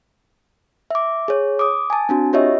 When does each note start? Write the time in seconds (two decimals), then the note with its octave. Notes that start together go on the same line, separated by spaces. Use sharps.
0.91 E5 D6
1.28 G#4 C#5
1.59 D6 D#6
1.90 G#5 A5
2.09 C4 D4 F#4
2.33 F4 G4 C#5 D#5 E5